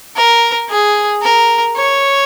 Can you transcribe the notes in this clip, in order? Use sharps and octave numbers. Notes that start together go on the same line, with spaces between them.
A#4
G#4
A#4
C#5